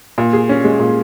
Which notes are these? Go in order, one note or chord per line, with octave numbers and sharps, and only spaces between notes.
A#2
G#4
C#4
G#3
A#2